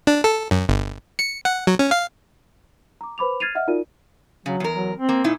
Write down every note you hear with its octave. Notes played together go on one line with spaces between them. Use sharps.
D4
A4
F#2
G1
C#7
F#5
F#3
C#4
F5
A#5 D6
B4 C5 B5 D6 F7
F6 G#6 A6 C7 D#7 F7
D#5 E5 F#5 F6
D#4 F4 F#4 A#4 D5 D#7
C#3 F#3
E2 A#4
F#3
C4
A#3
A#2 D#4 E4